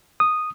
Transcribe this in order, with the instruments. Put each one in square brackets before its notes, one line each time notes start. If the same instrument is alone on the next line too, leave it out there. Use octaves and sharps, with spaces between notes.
[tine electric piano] D#6